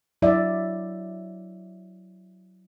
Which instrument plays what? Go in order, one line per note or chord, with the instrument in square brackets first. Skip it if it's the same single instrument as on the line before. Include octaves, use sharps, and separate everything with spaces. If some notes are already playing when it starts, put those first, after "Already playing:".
[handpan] F#3 E4 D5 E5